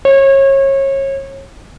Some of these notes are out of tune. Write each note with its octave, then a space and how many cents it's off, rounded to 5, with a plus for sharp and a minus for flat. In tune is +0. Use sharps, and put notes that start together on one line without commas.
C#5 -30